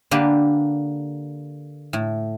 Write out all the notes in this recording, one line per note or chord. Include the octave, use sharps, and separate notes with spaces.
D3 A#3 G4 B4
A2